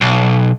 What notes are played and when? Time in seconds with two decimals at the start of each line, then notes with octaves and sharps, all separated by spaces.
0.01 B1